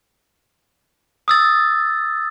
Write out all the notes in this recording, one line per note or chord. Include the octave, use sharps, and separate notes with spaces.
D#6 E6 A6